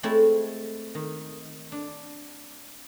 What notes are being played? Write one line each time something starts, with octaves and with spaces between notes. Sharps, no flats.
G#3 A3 C4 E4 C#5 A5
D#3
D4